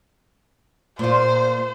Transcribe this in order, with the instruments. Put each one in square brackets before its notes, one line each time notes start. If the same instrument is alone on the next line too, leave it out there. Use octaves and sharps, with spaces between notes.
[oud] A#2 F4 [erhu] C5